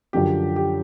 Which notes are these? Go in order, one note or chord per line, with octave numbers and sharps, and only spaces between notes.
F#2 D3 F3 G4
G4